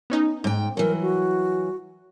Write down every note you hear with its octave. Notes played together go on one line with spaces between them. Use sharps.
B3 C#4 D#4
G#2 G5
E3 F#3 A#4
F#4